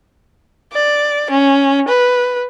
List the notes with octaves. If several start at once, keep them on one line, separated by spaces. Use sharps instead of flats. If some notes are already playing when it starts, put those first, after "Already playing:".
D5
C#4
B4